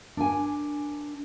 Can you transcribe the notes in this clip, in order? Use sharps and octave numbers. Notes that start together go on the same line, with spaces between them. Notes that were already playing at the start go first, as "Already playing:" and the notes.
D4 A#4 G#5